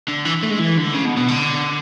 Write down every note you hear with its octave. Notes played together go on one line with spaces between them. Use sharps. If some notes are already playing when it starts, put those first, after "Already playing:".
D3
E3
A3
G#3
E3
D3
C#3
B2
B2
D3